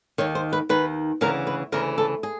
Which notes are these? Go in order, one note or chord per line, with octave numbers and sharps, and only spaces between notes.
D#2 D#3 C#5
C5
B4
D#2 D#3 B4
D2 C#3 E3 A#4
B4
D2 C#3 E3 A#4
A4
G#4